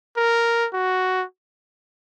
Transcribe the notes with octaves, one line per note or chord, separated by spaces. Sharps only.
A#4
F#4